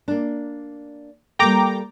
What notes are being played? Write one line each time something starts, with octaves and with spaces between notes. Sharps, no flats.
A#3 D4
G3 A#3 A4 G5 A#5 D6